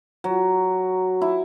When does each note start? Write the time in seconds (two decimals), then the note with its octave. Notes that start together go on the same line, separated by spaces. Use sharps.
0.24 F#3
1.22 E4